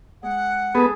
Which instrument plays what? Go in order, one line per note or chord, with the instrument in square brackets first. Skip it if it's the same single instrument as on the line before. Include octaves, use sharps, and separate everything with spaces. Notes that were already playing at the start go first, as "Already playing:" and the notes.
[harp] G#3 [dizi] F#5
[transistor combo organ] B3 [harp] G#4 A4